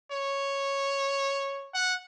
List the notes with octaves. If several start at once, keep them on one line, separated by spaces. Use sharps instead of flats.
C#5
F#5